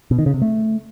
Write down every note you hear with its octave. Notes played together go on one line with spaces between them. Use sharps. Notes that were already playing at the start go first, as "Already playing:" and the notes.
B2
D#3
C#3
C3
A3